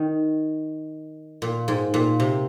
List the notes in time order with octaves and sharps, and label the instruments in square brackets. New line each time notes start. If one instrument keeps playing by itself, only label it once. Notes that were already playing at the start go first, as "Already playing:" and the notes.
Already playing: [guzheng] D#3
A#2
G#2
A#2
C3